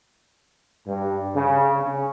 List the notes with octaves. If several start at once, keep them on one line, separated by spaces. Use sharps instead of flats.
G2
C#3
C#4